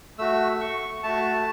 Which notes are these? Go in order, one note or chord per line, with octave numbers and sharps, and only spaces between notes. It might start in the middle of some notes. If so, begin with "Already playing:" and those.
A3 F#4 E6
C#6
A3 F#4 A5